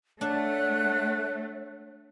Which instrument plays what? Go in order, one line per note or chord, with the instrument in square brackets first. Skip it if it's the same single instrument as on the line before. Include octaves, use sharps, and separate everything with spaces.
[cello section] A3 [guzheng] D4 A4 [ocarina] C#5 [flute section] F#5 F#6